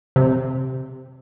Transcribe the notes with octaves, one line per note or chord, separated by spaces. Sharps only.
C3